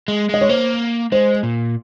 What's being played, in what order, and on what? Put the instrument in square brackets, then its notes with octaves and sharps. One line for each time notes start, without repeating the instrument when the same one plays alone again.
[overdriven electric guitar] G#3
[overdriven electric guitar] G#3 [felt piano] D#5
[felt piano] C#5
[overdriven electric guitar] A#3 [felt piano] C5
[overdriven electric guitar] G#3 [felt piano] C5
[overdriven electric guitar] A#2